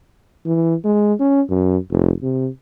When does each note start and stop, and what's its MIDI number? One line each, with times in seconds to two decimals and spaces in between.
0.46 0.75 52
0.85 1.14 56
1.19 1.42 61
1.49 1.78 42
1.91 2.12 29
2.23 2.49 48